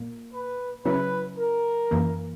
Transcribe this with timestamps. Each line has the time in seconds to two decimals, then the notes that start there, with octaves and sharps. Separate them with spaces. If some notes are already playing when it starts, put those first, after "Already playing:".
Already playing: A#2 A#3
0.33 B4
0.85 C#3 F#3 C#4 E4 B4
1.38 A#4
1.91 F#2 E3 A#3